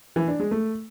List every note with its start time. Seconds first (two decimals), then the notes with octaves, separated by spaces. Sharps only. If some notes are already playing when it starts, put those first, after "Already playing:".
0.16 E3
0.28 D4
0.40 G#3
0.51 A3